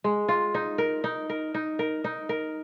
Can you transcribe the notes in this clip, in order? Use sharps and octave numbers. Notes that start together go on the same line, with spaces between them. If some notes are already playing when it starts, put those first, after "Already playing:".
G#3
F4
D#4
A#4
D#4
A#4
D#4
A#4
D#4
A#4